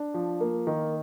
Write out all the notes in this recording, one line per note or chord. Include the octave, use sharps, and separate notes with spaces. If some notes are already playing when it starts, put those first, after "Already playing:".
Already playing: D4
F3
A#3
D#3